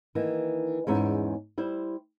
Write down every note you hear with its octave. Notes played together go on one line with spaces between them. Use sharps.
D#3 E3 A#3
E2 G#2 C#4 E5
G3 E4 C5